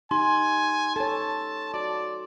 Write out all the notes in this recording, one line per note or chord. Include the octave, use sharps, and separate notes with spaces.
D#4 G4 G#5 C6
A4 C#5 A5
F#4 D5